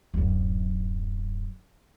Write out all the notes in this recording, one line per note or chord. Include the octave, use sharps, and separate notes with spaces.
D1 F#2